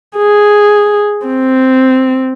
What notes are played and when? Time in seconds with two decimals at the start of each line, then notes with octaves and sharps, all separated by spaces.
0.18 G#4
1.27 C4